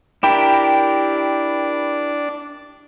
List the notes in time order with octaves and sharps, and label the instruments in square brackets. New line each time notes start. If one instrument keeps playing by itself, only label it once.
[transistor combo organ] D4 [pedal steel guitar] E4 G4 A#4 [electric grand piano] G5 B5 E7